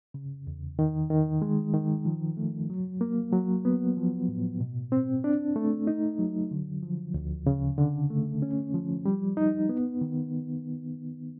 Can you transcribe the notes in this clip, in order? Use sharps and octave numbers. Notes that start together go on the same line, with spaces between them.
C#3
E2
D#3
D#3
G#3
D#3
F3
A3
F#3
A#3
F#3
B3
F3
A2
B2
C4
D4
A3
D#4
F#3
D3
F3
D2
C#3
D3
A3
C#4
F3
G3
D#4
B3
D#3